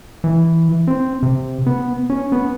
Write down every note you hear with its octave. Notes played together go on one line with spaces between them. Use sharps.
E3
C4
C3
B3
C#4
B3